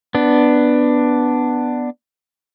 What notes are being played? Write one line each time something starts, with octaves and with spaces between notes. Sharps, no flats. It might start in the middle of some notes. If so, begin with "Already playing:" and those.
B3 D4